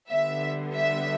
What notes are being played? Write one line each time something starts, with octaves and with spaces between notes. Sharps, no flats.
D3 G3 B3 E5
E5